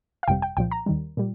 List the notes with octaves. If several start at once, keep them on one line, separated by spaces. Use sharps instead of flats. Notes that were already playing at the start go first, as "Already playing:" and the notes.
F5
G1 F2 C3 G3 G5
G5
C2 A#2 F3 G5
A#5
D#2 D#3 G3
A#2 G3